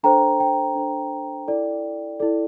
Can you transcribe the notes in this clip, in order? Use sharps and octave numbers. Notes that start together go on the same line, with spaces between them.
D4 A4 C5 G5 A#5
G5
D4 A4 C5
E4 A4 D5
E4 A4 D5